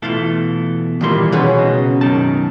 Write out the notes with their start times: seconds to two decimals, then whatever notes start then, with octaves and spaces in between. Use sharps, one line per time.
0.02 B2 E3 A3 F4 F5 A5
1.01 A#2 D#3 E3 G3 A#3 C6
1.32 B2 B3 C#4 F#4 G#4
1.58 C#3 D#4
2.01 F#2 B2 D#3 A5